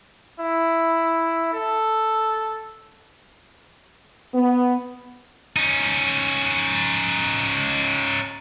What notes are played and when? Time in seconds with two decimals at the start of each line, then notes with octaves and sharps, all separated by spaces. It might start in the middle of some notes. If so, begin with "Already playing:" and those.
0.40 E4
1.53 A4
4.34 B3
5.56 C#4 D#4